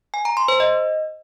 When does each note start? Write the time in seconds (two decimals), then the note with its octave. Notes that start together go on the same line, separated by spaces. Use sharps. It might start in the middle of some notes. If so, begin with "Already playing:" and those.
0.14 G#5
0.25 A#5
0.37 C6
0.48 C5
0.60 D#5